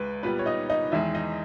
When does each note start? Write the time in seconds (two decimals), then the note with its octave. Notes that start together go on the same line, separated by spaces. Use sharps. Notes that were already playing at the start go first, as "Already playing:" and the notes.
Already playing: C#2 G#3 B4
0.23 A#2 G3 B3 B4
0.39 C#5
0.46 D#4 D#5
0.70 D#4 D#5
0.92 E2 D#3 G#3 E4 E5
1.15 D#4 D#5